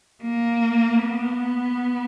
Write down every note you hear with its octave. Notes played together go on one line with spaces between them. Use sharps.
A#3
B3